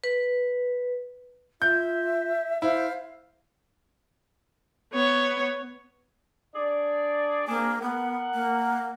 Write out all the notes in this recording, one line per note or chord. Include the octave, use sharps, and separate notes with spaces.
B4
F4 E5 G6
E4 C5 F5
B3 C#5
D4 G#4 D5
A#3 C4 D4 G#4
B3 A#4 F#5
A#3